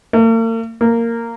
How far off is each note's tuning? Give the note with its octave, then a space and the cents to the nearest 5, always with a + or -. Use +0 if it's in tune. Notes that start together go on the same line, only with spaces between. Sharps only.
A#3 -45
A#3 -10